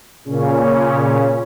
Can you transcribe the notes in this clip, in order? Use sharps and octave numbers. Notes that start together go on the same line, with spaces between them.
A#2 C#3 C#4